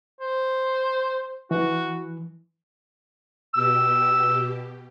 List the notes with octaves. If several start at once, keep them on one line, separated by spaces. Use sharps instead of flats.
C5
E3 F#4
B2 G4 E6